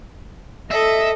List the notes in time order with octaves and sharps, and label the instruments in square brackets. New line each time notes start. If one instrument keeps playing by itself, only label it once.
[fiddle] A4 [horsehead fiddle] D#5 [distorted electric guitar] E5